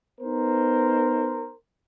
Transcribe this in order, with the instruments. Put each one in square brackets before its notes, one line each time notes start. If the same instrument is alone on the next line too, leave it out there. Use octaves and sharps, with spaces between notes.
[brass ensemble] B3 D#4 A#4 C5